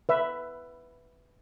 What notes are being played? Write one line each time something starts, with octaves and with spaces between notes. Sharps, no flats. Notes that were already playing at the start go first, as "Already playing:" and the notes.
B4 E5